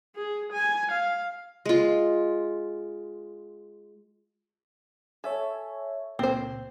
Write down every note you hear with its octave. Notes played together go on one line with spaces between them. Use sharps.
G#4
G#5
F5
G#3 F4
A4 C#5 E5 G#5
C#2 A#2 C4 C5